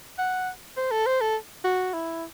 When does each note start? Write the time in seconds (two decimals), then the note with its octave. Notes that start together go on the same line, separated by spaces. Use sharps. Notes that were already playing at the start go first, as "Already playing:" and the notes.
0.19 F#5
0.77 C5
0.91 A4
1.06 C5
1.21 A4
1.64 F#4
1.93 E4